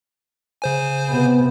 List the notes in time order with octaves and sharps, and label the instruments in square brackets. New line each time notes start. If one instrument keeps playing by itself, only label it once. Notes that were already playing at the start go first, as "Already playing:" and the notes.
[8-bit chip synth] C#3 C5 G#5
[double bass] C3 B3